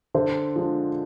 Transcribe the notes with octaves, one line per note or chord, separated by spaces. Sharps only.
D3 C5
F3 G#3 D4